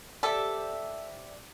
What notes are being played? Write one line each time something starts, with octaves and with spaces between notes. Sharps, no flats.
G4 A4 C5 D5 E5